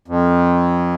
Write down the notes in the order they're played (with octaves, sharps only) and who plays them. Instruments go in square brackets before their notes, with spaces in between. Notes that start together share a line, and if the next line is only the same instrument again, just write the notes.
[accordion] F2